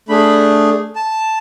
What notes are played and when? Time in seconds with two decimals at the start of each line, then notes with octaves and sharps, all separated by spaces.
0.09 A3 D4 G#4 B5
0.96 A5